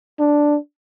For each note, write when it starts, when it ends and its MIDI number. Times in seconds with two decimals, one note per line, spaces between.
0.19 0.56 62